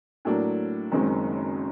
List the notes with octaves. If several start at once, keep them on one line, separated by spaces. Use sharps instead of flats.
A2 F#3 A#3 D4
F#1 F#2 D#3 G#3 C4